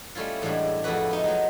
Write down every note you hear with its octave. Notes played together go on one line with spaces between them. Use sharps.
G3 A3 C#4 E4 F4
E2 A2 G3 G#3 D4
F2 A3 E4 F#4 B4
B3 D#4
F#3 G#3 D#4